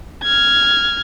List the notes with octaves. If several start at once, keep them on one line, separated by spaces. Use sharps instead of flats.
F6 G#6